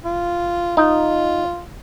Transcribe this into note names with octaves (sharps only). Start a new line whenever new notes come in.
F4
D#4 F4